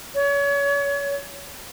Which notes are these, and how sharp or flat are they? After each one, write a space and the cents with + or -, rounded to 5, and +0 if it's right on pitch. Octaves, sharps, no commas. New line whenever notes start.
C#5 +30